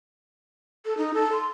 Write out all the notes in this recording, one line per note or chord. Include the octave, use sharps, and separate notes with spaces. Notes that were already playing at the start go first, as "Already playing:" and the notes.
A4
D#4
A4
C6